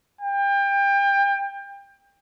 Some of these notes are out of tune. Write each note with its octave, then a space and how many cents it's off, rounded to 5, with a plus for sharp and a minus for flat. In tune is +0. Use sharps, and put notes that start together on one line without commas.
G5 +30